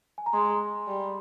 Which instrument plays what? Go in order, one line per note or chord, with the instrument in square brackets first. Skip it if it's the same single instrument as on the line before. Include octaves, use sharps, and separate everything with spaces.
[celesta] G#5
A#5
[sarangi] G#3 [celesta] C6
[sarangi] G3